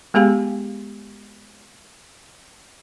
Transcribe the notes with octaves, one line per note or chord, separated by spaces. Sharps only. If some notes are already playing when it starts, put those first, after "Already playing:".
G#3 B3 G4 G#4 F5 G#5